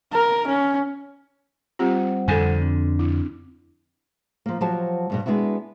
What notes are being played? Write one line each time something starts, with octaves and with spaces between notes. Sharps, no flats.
A#4
C#4
G3 C4 F4 G4 C5 F#5
F2 D3 A4 G#5
C4 D4
E4
F3 A#3
F3 F#3 F#4 G4 C5 A5
E2 G2 B2
G#3 B3 D4 E4 F#4